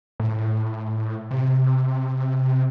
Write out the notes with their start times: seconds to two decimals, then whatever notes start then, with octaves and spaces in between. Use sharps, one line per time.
0.20 A2
1.31 C3